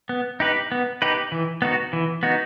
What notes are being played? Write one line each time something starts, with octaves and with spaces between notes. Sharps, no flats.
B3
D#4 G4 B4
B3
D#4 G4 B4
E3
B3 D#4 F#4
E3
B3 D#4 F#4